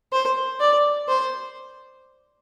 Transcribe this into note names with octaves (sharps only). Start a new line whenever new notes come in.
C5
D5
C5